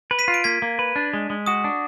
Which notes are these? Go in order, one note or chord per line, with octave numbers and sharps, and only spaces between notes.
B4
B6 D#7
F4
D7
A#3 G#6 B6
A#3
B4
D4
G#3
G#3
F#4 D#6
D4